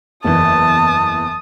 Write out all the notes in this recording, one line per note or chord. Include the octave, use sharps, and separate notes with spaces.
F#1 E2 E3 A5 D#6